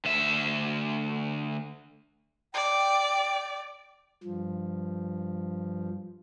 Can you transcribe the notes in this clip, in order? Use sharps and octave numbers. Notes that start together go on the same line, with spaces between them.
D2 E5
D5 G5
G2 F3